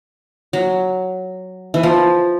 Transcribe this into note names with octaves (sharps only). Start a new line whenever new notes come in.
F#3
E3
F3